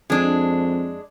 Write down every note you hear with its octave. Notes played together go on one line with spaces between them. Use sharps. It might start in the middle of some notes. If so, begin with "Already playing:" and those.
F2 G#3 D4